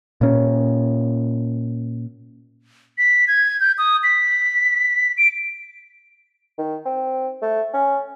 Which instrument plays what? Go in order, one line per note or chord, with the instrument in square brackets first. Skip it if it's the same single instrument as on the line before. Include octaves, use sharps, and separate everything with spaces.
[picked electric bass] A#2 C#4
[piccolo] B6
G#6
G6
D#6
B6
D7
[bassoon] D#3
C4
A3
C#4